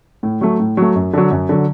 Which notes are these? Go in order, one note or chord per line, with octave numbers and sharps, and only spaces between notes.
A2
F#3 A3
A2
F#3 A3
F#2
D3 F#3
F#2
D3 F#3